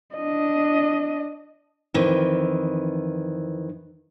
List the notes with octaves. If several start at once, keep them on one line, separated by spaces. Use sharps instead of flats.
D4 D#5
F2 D#3 E3